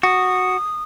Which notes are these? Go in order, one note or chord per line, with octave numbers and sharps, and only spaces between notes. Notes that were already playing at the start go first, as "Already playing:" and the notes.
F#4 D#6